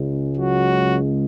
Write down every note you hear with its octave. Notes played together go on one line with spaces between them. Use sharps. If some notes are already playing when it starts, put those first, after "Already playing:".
Already playing: C#2 C#3 G#3
F#3 F#4